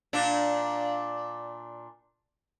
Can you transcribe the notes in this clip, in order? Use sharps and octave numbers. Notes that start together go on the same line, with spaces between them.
A#2 D4